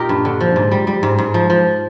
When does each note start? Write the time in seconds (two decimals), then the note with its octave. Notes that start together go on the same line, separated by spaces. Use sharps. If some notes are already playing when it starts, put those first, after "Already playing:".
Already playing: A#2 D#4 F4 G4 A#4
0.09 G2
0.25 D3
0.41 F3
0.56 G#2
0.72 G3
0.87 G3
1.03 G#2
1.19 G#2
1.34 F3
1.50 F3